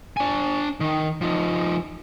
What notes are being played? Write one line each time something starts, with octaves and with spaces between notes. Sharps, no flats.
D4 G#5
D#3
F3 D#4